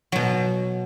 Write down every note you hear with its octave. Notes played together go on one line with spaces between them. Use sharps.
B2 F#3